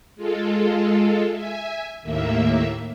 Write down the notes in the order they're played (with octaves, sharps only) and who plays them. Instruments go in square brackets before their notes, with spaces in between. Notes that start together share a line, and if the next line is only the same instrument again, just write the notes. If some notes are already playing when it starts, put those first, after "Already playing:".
[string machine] G#3 F4 A4
E5 G#5
D#2 A2 A#3 E5